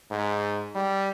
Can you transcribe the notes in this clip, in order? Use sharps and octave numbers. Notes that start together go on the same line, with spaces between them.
G#2
G3